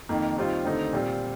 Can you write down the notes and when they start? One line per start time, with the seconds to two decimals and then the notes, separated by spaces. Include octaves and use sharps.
0.09 F2 D#3 A#3
0.37 D#2 D#3 G3 C4 F4
0.65 D#2 D3 A3 C4 D#4
0.93 A#2 G3 C4 F4